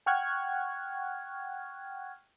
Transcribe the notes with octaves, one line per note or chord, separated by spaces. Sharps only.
F#5 G5 C#6 F6 F#6 G#6